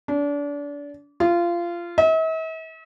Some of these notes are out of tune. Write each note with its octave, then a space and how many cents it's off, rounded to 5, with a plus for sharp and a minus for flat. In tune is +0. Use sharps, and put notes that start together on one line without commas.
D4 -30
F4 -20
E5 -45